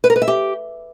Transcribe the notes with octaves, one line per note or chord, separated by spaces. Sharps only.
B4
A#4
B4
E5
G4